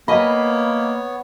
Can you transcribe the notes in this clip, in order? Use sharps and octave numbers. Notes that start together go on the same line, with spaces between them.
A#3 B3 C#5 D#5 G#5 B5